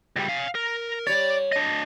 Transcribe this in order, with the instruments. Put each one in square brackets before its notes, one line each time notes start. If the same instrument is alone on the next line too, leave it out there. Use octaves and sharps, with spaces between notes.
[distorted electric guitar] C#2 G3
F5 G#5
A#4
[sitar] G3 C#5 [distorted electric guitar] D5
[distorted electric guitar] D4 D#5